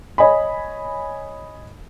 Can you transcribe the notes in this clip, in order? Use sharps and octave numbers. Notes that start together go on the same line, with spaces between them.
C#5 D#5 G#5 B5